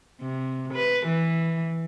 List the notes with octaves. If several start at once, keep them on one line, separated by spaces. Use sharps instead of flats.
C3
B4
E3